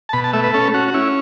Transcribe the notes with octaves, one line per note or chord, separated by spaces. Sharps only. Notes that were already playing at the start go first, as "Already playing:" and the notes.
A5
B2 B5
A5
A3 E5
B4
C#4 A4
C#4 F#4
F#4
C#4 E4